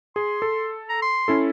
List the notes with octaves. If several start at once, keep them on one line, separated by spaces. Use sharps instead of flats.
G#4 C6
A4
A#5
C6
C#4 E4 A4